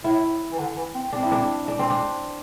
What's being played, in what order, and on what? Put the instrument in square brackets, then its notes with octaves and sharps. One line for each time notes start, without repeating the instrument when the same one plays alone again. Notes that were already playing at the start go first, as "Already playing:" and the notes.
[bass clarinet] A2 [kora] E4
[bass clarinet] E3
D3
E3
C4
[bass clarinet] C4 [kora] D4
[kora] E4
D4
D4
C4
D4